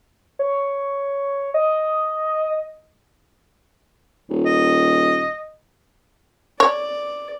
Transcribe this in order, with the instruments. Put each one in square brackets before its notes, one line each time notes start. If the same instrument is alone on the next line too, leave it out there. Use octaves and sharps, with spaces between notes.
[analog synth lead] C#5
D#5
[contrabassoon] D#1
[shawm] D#5
[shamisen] C#5 [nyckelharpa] D5